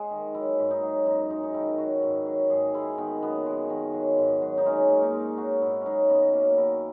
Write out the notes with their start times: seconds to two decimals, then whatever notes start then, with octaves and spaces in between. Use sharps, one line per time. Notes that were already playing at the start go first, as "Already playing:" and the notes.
Already playing: G#3 G#4
0.11 D#3
0.35 F#3 E4
0.59 G#2
0.71 D#4
0.83 F#3
1.06 F#2 D#4
1.30 G#3 D#4
1.43 D#4
1.54 D#3 E4
1.78 F#3 F#4
2.02 G#2
2.26 F#3
2.50 G#2 G#4
2.74 G#3 E4
2.98 D#3 B3
3.22 F#2 B3
3.46 G#3
3.70 D#3
3.94 F#3
4.18 G#2
4.42 F#3
4.58 D#4
4.66 G#3 C#4
4.90 A#2
5.02 D#4
5.14 G#3
5.37 F#3 F#4
5.62 G#2 E4
5.81 F#3 C#4 D#4
6.09 F#2 B3
6.33 F#3 A#3
6.57 D#3 E4